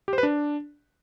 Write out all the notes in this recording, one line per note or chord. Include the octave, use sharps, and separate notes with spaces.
G4
C5
B4
D4